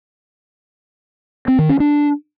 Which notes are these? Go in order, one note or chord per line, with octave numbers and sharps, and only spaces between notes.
C4
D#3
C#4
D4